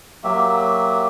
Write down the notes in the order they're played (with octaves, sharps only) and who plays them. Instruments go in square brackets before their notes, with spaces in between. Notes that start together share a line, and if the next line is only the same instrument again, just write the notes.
[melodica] F#3 A#3 G4 E5